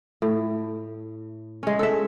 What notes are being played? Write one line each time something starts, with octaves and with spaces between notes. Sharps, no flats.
A2
G#3 C#4
A4 E5